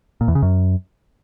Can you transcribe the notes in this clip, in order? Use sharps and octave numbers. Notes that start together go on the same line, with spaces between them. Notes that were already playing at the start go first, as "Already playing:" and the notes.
A#2
E2
C#3
F#2